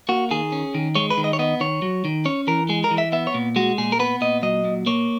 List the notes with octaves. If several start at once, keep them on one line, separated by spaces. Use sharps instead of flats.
A#3 F#4
D#3 G#4
C#4
D#3
G#3 C#5
B4
D#3
D#5
C#5
B3 D#5
D#3 C#5
F#3
D#3
C#4 C#5
E3 A#4
G#3 G#4
A#4
E3
E5
B3 E5
C#5
A#2
G#3 F#4
A#2 G#4
A#4
B3 B4
A#2 D#5
F#3 D#5
A#2
A#3 C#5